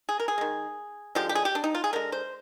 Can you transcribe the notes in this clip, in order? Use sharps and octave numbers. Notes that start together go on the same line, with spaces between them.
G#4
A#4
G#4
D#3 G#3
D3 F3 G#3 G4
G4
G#4
G4
D4
D#4
F4
G#4
D3 G#3 A#4
C5